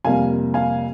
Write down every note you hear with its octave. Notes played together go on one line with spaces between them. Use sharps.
F2 C3 G3 A#3 F5 G#5
F5 G#5